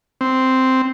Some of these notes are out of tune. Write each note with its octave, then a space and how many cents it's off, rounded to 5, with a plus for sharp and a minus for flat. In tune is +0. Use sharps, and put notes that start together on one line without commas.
C4 -5